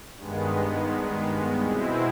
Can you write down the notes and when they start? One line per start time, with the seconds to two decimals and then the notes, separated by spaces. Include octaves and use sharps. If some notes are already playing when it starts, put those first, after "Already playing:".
0.16 G2 D#3 G#3 B3
1.64 B2 G#3 C4 E4